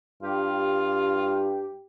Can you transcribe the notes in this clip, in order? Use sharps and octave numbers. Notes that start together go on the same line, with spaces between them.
G2 F4 G4